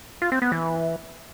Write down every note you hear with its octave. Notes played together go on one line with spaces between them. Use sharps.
F4
C4
B3
E3